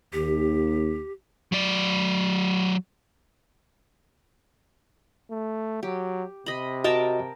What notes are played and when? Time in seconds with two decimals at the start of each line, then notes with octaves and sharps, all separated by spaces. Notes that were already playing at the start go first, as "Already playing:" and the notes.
0.13 D#2 G4
1.52 F#3 D5
5.31 A3
5.83 F#3 G4
6.46 C3 D#5 B5
6.84 F#4 A#4 D#5 G5 A5